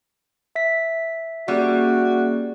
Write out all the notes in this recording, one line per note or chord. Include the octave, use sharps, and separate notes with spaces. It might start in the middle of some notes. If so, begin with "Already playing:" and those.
E5 B6
G3 A#3 C#4 F#4 G#4